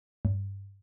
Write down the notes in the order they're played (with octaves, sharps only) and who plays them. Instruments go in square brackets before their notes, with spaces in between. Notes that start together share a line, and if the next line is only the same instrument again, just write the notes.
[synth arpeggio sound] G2